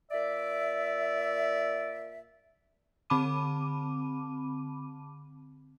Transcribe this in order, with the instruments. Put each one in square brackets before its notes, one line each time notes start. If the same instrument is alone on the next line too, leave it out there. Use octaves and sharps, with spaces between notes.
[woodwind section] A#2 D5 E5
[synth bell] D3 C4 A5 B5 D6 D#7